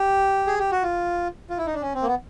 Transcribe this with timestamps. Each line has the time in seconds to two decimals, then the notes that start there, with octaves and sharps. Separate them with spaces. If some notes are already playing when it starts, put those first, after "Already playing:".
Already playing: G4
0.47 G#4
0.59 G4
0.71 F#4
0.83 F4
1.50 F4
1.58 E4
1.66 D#4
1.74 D4
1.82 C#4
1.95 C4
2.02 A#3
2.07 B3